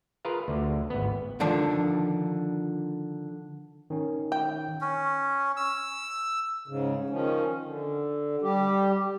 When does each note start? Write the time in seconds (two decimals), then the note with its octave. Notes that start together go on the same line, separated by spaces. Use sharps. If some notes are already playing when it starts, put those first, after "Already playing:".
0.25 F4 G#4 A#4 B4 F5
0.48 D2 D3
0.90 G#1 B3
1.40 D3 D#3 F3 D4
3.90 D#3 C#4
4.32 G5
4.81 C#4
5.57 E6
6.68 G#2 C#3
7.10 D#3 F3 C#4
7.65 D3
8.42 G3 G4